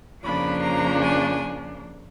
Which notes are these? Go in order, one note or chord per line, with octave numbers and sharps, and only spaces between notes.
F2 C#3 F3 A#3 D4 B5
A#5
G#5